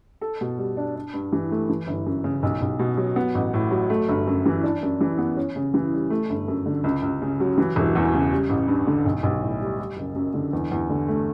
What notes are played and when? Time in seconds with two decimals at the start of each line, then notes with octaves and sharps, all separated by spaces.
0.21 A4
0.41 B2
0.58 G3
0.77 D4
0.96 D4
1.14 G2
1.32 E3
1.51 A3
1.69 E3
1.87 G1
2.06 F#2
2.24 C#3
2.43 B1
2.62 B1
2.79 B2
2.97 F#3
3.16 B3
3.35 A1
3.54 A2
3.71 F#3
3.90 A3
4.09 G1
4.27 F#2
4.46 E3
4.63 D4
4.83 F#2
5.01 E3
5.18 B3
5.37 C#4
5.56 C#3
5.74 E3
5.93 G3
6.10 A3
6.30 G1
6.48 F#2
6.66 D3
6.84 C#2
7.02 C#2
7.22 C#3
7.40 F#3
7.58 E3
7.76 E1
7.95 E2
8.14 C#3
8.32 G3
8.50 A1
8.68 G2
8.87 D3
9.06 B1
9.23 B1
9.42 A2
9.60 G3
9.79 G3
9.97 F#1
10.15 F#2
10.34 D3
10.53 E2
10.72 E2
10.90 D3
11.08 A3